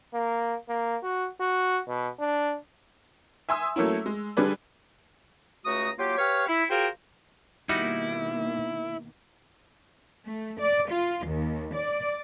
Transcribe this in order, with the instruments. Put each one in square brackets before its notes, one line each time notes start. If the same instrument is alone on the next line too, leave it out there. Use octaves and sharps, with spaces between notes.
[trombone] A#3
A#3
F#4
F#4
B2
D4
[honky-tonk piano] E5 G#5 C6 D#6 E6
F#3 A3 A#3 C#4 E4
G#3
D3 G3 G#4 B4 D5
[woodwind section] C#2 A3 F#4 A#5 D#6
F#3 A#3 F4 G4
G4 B4 C#5 F5 C#6 F6
E4
F4 F#4 G#4 A#4 C5 G5
[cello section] B2 D#3 A#3 [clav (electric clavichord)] G3 D#4 F#4 [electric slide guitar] E4
[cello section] A3
D5
F4
D#2
D5